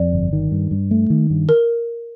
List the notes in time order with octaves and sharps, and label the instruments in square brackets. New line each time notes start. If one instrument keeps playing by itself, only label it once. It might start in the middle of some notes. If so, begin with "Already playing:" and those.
Already playing: [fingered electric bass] F2 [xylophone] D5
[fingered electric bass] G1
D#3
G2
G2
A3
D#3
G2
[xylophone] A#4